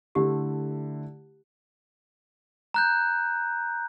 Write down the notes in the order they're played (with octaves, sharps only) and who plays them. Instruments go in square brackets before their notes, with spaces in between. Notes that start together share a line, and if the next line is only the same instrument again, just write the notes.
[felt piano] D3 A3 E4 [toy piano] G4
[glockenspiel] A#5 F#6 G6